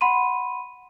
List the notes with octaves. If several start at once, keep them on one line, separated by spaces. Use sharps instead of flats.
F#5 B5 C6 D#7